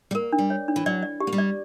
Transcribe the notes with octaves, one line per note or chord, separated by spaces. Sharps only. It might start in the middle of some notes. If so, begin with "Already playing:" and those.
G3
A#3 A#4
D4
G3
C#5
D4
E3
F#3 D5
D5
G4
A#3
G3
D5